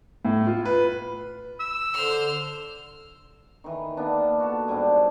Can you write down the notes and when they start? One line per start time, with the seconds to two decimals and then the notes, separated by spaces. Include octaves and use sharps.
0.25 A2
0.47 F4
0.65 B4
1.60 E6
1.93 D3 C5 F6
3.64 D#3 E3
3.97 A#3 B3 D4
4.40 F#4 A4
4.68 G#2 G3 C4 D4